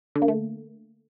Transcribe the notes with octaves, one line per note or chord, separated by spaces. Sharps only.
D3
A#3
A3